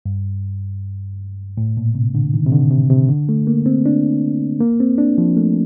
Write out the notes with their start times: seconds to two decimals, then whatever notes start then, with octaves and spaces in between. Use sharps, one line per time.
0.06 G2
1.57 A2
1.77 A#2
1.95 C3
2.15 D3
2.34 D#3
2.46 C3
2.52 D3
2.71 C3
2.90 C3
3.09 D3
3.29 A3
3.47 A#3
3.66 C4
3.86 D4
4.60 A#3
4.80 C4
4.98 D4
5.18 F3
5.37 A3